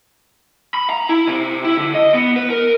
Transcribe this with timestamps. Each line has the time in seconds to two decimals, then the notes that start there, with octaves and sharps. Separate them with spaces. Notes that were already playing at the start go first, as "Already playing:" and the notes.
0.74 B5
0.90 A#5
1.09 E4
1.27 C3
1.64 E4
1.77 D3
1.95 D#5
2.14 B3
2.36 B4
2.50 A#4